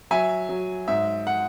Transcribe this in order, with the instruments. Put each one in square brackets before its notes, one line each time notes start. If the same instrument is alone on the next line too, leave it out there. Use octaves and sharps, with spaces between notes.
[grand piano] F#3 E5 G#5
F#3
G#2 E5
F#5